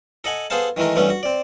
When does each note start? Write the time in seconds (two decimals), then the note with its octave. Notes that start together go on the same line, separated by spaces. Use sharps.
0.24 A4 D#5 F#5 G#5
0.50 B3 G#4 A4 C5 F5 A5
0.77 D#3 E3 G#3 A3 A#4
0.96 G2 E3 A3 B3 C#4
1.10 F#4
1.23 C4 D5